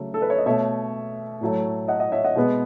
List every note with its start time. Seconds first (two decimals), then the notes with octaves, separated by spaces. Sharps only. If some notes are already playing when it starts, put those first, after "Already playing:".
Already playing: C#3 F#3 A3
0.14 A4
0.22 B4
0.30 C#5
0.38 D#5
0.46 B2 A3 C#5 E5
1.41 A2 F#3 A3
1.88 D#5 F#5
2.00 D#5 F#5
2.12 C#5 E5
2.24 D#5 F#5
2.35 B2 G#3 B3